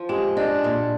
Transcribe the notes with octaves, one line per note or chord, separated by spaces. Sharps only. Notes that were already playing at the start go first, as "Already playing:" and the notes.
Already playing: F3
G#3 G4 G5
D4 D#5
A#2